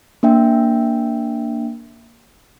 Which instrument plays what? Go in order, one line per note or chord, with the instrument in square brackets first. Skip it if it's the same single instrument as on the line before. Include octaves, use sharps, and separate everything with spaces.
[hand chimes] A#3 D4 E5 G5